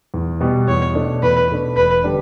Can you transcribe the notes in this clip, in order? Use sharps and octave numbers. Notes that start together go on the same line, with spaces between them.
E2
B2 G3 B3
E2 C#5
B2 A3 D4
E2 B4
B2 A3 D4
E1 B4
D3 G3 D4